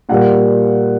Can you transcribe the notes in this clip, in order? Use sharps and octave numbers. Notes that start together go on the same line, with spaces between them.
A#2 G3 A#3 F#5